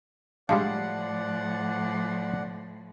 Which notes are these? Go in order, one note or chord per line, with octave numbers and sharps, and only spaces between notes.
A2 F3 G3 G#3 D4 D5 F5 F#5